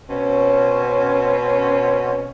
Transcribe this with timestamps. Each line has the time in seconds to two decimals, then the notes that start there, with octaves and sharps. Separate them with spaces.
0.09 B2 C4 C#4